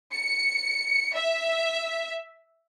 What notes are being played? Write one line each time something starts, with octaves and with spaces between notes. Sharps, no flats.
C#7
E5